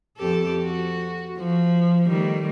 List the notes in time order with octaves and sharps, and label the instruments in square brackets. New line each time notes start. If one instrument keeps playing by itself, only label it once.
[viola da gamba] F2 G4 A4
F#4
F3
D#3 G3 A3